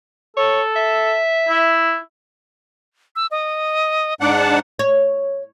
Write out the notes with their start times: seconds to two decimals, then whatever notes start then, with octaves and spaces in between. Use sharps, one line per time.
0.37 A4 C#5
0.76 E5
1.49 E4
3.16 E6
3.31 D#5
4.21 G#2 D4 F#5 D6
4.37 A5
4.79 C#5